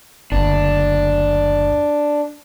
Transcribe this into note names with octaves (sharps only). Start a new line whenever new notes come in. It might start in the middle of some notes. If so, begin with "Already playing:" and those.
F#1 D2 D4